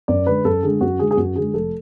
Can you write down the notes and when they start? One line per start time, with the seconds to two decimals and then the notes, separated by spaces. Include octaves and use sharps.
0.08 F#2 D5
0.26 D3 G#3 B4
0.44 F#2 A4
0.63 D3 G#3 G#4
0.81 F#2 F#4
0.99 D3 G#3 G#4
1.11 G#4
1.17 F#2 F#4
1.36 D3 G#3 G#4
1.54 F1 A4